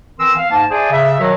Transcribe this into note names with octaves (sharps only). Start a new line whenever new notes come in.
E3 C4 A#4 C6 E6
F5
G#2 A#3 A5
G#4 C5 D5 E5 G#5 A5
C#3 E5
B2 D#3 F#3